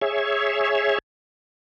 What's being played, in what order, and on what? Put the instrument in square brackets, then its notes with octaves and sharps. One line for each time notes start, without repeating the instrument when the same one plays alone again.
[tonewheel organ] G#4 C#5 E5